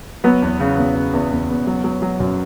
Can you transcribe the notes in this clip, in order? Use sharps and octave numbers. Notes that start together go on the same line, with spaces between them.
F#3 B3
E2
C#3
E2
C#3
E2
E2
E2
F#3
F#3
F#3
F#2